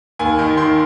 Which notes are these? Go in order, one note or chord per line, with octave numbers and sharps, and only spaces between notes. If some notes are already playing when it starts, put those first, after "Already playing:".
D#2 G#5
D#3
D#3 C6